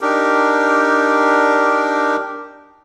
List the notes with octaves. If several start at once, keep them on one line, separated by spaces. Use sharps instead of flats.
D4 D#4 G4 A#4